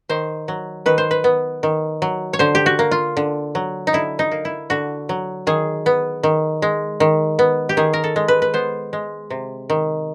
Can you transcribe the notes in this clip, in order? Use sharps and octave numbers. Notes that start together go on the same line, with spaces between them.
D#3 C5
F#3
D#3 B4
C5
B4
B3
D#3
F#3
C#5
D3 C5
G4
F#4
A#3
F4
D3
F#3
D#4
D3 E4
D#4
A#3
E4
D3 F#4
F#3
D#3 G#4
B3
D#3
G#3
D#3
B3
G4
D#3 G#4
A#4
A4
G#3
B4
B4
B3 C5
G#3
C3
D#3